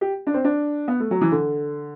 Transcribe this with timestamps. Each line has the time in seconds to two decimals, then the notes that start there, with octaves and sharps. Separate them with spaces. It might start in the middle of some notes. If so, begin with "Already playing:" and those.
0.01 G4
0.27 D4
0.34 C4
0.44 D4
0.88 B3
1.00 A3
1.11 F#3
1.21 E3
1.32 D3